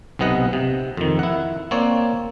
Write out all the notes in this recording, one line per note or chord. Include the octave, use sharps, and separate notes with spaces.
B1 C3 B3 D#5 F#5
C3
F2 D#3
E4 F#5
A#3 C4 C#5 D5